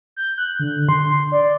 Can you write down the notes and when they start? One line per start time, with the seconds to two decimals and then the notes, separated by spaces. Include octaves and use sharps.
0.16 G6
0.38 F#6
0.59 D3
0.89 C6
1.32 D5